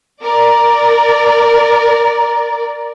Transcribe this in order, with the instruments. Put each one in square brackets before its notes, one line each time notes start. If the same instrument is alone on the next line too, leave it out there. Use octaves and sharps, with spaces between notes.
[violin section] A#4 D5